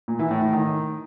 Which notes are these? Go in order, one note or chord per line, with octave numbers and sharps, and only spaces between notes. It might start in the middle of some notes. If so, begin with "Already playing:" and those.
A#2
E3
A2
A2
D#3